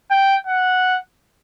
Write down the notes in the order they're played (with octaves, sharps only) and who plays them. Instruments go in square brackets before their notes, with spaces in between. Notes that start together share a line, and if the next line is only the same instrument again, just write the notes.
[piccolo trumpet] G5
F#5